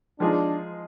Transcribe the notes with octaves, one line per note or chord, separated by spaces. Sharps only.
F3 G#3 D4 D#4 G#4